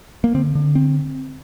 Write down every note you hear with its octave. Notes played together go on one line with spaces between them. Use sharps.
A#3
D3 C4
D3
C4